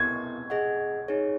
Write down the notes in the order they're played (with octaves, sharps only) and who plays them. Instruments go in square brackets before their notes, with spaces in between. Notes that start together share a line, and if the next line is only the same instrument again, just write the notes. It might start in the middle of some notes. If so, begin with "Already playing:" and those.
Already playing: [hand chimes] B3 E4 A#4 [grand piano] G#6
[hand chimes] G#4 D#5 F#5
D#4 G#4 C#5